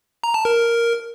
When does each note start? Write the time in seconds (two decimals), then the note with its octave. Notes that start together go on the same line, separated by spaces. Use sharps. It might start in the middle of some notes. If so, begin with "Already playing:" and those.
0.24 A#5
0.34 A5
0.45 A#4